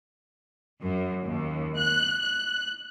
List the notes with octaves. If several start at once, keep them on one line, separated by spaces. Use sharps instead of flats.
F#2
D#2
F#6
F#6